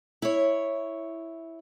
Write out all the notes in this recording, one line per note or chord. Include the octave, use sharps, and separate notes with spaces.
E4 C#5